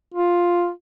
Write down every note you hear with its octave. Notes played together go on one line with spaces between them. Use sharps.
F4